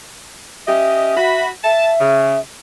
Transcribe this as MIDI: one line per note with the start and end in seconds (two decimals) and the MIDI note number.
0.67 1.11 61
0.67 1.11 67
0.67 1.11 75
0.67 1.43 76
1.16 1.48 66
1.16 1.48 83
1.64 2.39 76
1.64 1.90 81
2.00 2.36 49